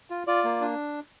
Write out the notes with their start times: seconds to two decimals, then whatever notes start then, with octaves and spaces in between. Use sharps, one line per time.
0.10 F4
0.27 F4 D5
0.44 A#3
0.61 D4